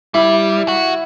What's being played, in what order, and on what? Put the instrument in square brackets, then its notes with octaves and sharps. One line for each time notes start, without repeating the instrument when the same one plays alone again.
[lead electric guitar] G3 [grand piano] E4
[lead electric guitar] F#4